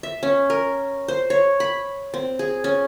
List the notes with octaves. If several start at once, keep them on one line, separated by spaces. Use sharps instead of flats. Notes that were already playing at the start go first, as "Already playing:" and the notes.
E5
C#4
A#4
C5
C#5
B5
C4
G#4
C#4